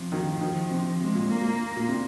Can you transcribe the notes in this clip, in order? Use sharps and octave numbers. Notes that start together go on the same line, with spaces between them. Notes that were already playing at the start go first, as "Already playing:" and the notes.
Already playing: C3 F3
D#3
D#3
C3
C3 G#3
A#2
A#3
A#2
A#2
C3